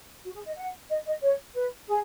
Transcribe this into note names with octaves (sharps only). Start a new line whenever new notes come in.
F#4
G#4
D#5
F#5
D#5
D#5
C#5
B4
G#4